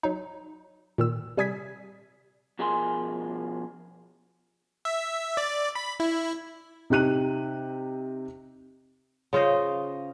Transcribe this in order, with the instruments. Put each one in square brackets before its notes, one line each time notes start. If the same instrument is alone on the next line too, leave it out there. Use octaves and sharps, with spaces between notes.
[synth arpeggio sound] F#3 D#4
A#2 D#3 E6
C3 G3 G#5 D#6 G#6 B6
[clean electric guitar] B2 F3 G#4 A#4 G#5 C6
[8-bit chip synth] E5
D5
B5
E4
[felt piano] C3 D#4 G4 F#6 D#7
[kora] C#3 F4 C5 D#5